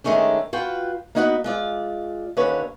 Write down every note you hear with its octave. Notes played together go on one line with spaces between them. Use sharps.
D#3 G#3 A3 C#4 D4
F4 F#4 B4 G5
A#3 B3 D#4 F#4 A#4 B4
G#3 F4 D5
D#2 D3 C#4 B4 C#5 F5